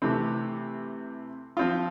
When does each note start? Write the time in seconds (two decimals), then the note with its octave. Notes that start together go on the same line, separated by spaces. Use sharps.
0.02 C3 E3 A3 C4
1.57 F3 C4 F4